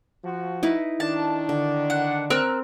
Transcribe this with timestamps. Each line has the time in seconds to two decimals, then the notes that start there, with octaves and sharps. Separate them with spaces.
0.24 F3 F#4
0.63 D#4 E4 B4
1.00 D#3 D4 A5
1.49 D3
1.90 F#5
2.30 C4 A#4 E6 F#6